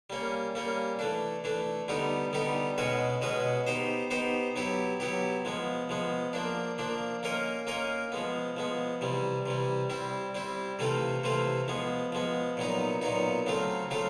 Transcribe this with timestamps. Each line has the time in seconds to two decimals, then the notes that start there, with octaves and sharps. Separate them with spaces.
0.10 G3 A#3 C#4
0.55 G3 A#3 C#4
0.99 E3 A3 D4
1.44 E3 A3 D4
1.88 D3 G3 B3 D#4 G4
2.33 D3 G3 B3 D#4 G4
2.78 B2 G#3 C#4 F#4 B4
3.22 B2 G#3 C#4 F#4 B4
3.67 B3 D#4 G4 C5
4.11 B3 D#4 G4 C5
4.56 F#3 B3 E4 G4
5.00 F#3 B3 E4 G4
5.45 F3 G#3 B3
5.89 F3 G#3 B3
6.33 F3 A#3 D4
6.78 F3 A#3 D4
7.23 A#3 C#4 F4 A#4 D#5
7.67 A#3 C#4 F4 A#4 D#5
8.12 F3 G#3 B3
8.57 F3 G#3 B3
9.01 C3 E3 G3
9.46 C3 E3 G3
9.90 G3 C4 E4
10.35 G3 C4 E4
10.79 C3 E3 A3 C4 F4
11.24 C3 E3 A3 C4 F4
11.68 F3 G#3 B3
12.12 F3 G#3 B3
12.57 A#2 F#3 B3 D#4
13.01 A#2 F#3 B3 D#4
13.46 C#3 F#3 A3 C4 F4
13.91 C#3 F#3 A3 C4 F4